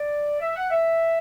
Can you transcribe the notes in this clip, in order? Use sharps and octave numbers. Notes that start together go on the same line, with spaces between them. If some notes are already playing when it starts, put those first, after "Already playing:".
Already playing: D5
E5
F#5
E5